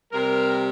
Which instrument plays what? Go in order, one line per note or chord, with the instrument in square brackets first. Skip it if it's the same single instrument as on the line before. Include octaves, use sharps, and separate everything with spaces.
[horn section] C3 G3 A#4